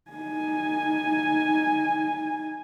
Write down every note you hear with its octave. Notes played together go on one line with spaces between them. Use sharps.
D#4 G#5